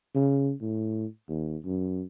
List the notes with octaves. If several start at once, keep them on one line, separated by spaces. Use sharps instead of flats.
C#3
A2
D#2
F#2